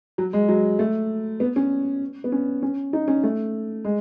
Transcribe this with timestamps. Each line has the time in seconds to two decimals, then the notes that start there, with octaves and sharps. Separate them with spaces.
0.18 F#3
0.33 G#3
0.49 F#3
0.79 A3
1.40 B3
1.56 C#4
2.24 B3
2.32 C#4
2.62 C#4
2.93 D#4
3.08 C#4
3.23 A3
3.85 G#3